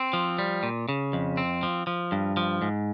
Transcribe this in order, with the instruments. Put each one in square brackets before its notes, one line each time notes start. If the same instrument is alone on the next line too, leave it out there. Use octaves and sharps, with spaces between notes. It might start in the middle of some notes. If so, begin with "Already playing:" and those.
Already playing: [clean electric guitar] C4
F3
G3
A#2
C#3
F2
C4
F3
F3
G2
F3
G#2